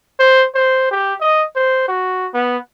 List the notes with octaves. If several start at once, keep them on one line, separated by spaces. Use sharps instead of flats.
C5
C5
G4
D#5
C5
F#4
B3